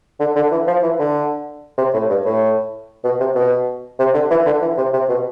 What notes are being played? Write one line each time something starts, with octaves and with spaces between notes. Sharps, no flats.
D3
D3
E3
F3
E3
D3
C3
A2
G2
A2
B2
C3
B2
C3
D3
E3
D3
E3
C3
C3
B2